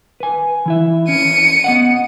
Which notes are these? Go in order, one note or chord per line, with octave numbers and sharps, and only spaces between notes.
B4 G#5
E3 E4 E5
C#4 C#7 D#7
B3 D#5 F#5